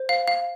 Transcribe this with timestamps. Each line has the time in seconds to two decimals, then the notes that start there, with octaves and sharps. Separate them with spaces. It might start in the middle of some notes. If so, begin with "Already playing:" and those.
Already playing: C5
0.09 F5
0.28 F5